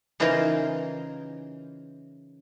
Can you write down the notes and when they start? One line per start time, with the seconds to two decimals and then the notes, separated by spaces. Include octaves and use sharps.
0.20 C#3 E3 D#4 F4 A#4 C5